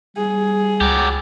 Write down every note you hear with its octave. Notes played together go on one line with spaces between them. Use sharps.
G3 G#4
C#2 F#3 G4